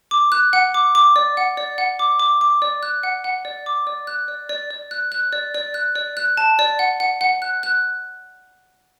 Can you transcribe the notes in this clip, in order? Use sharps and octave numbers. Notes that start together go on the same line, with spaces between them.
D6
F#6
F#5
D6
D6
D5
F#5
D5
F#5
D6
D6
D6
D5
F#6
F#5
F#5
D5
D6
D5
F#6
D5
D5
D5
F#6
F#6
D5
D5
F#6
D5
F#6
A5
D5
F#5
F#5
F#5
F#6
F#6